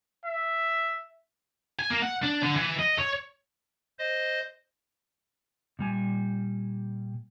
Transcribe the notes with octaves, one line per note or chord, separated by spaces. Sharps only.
E5
G#5
A#3
F#5
D4
D3
E3
D#5
C#5
C5 D#5
A#2 G3 G#5